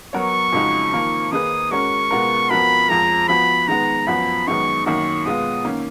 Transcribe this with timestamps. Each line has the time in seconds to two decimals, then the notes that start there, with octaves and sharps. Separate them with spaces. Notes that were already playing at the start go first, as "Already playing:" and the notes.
0.13 F#3 B3 F#4 A#4 C#5 C#6
0.53 F2 C#3 G#3 D#4 F#4
0.92 F2 D#3 A#3 F4 A#4
1.32 D#3 A#3 D#4 G#4 B4 D#6
1.71 G#3 C#4 F#4 A#4 C#5 C#6
2.11 B2 G#3 B3 F4 A#4
2.50 F2 F3 B3 F#4 A#4 B5
2.89 F2 F3 G#3 A#5
3.28 F3 B3 F#4 B5
3.68 D#3 G#3 B3 A#5
4.07 F#2 F3 B3 F#4 B5
4.47 F#2 D#3 G#3 B3 D#4 C#6
4.86 F#2 D#3 A#3 D#4 F#4 C#6
5.26 B2 G#3 B3 F4 D#6
5.65 D#3 A#3 C#4